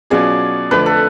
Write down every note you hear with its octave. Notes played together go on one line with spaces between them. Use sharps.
B2 F#3 C#4 F4 G#4 D5
F2 D3 F3 A3 B4
A4